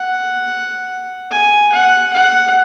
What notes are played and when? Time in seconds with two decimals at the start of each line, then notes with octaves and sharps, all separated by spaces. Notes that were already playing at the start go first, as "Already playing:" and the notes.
Already playing: F#5
1.31 G#5
1.73 F#5
2.14 F#5